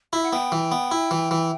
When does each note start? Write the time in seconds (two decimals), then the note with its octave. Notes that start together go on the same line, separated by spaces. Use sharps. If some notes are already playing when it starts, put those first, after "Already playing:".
0.13 E4 E5
0.23 F#5
0.33 B3 G5
0.52 E3
0.72 B3
0.91 E4
1.11 E3
1.31 E3